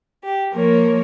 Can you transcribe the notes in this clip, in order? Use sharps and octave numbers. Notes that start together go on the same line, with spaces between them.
G4
F3 A#3 A#4 C#5